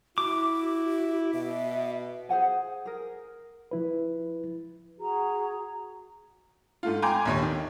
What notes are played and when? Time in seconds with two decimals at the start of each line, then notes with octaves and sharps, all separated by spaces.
0.18 E4 F#4 D6
1.34 B2 E5
2.29 G#4 C5 F#5 G#5
2.85 G#4 A#4
3.71 F3 E4 B4
4.98 F#4 G#4 A#5
6.83 G#2 A3 F4
7.02 G5 G#5 A#5 C6 D6 G6
7.25 A#1 D#2 C#5
7.43 D#3